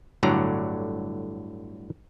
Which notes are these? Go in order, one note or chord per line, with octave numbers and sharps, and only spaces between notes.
G1 A2 D3 F#3 D5 A#5